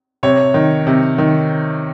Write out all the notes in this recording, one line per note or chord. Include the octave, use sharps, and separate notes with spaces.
C3 C#5
D#3
C3
D#3